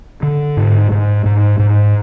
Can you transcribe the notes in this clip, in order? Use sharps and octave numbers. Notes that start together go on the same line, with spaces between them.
D3
G#2
G#2
G#2
G#2